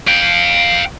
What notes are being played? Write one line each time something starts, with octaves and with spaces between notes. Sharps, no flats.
F5 G5